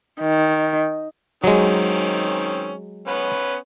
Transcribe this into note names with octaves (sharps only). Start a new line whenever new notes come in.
D#3
D#3 F#3 G#3 C4 C#4
B3 C#4 B4